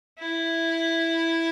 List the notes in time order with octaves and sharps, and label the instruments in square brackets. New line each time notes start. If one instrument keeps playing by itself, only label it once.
[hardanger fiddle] E4